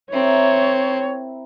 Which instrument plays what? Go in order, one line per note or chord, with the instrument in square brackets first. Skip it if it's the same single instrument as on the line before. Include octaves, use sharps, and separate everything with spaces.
[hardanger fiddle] C4 [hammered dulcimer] E4 G4 A#4 [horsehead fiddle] C#5